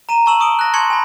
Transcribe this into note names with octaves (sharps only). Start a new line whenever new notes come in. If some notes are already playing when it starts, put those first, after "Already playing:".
A#5 D#7 E7
A5 A#5 C#6 E6 E7 F#7
C#6 D#6 D7 G7
F#6 A#6
A5 C6 C#6 G#6 C#7 F#7
G#5 B5